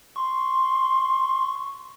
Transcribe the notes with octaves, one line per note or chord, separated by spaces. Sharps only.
C6 C#6